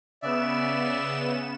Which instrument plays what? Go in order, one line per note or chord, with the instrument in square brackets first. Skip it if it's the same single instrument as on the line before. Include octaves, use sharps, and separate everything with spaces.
[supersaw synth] C#3 B3 E7 [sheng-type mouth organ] D5 E5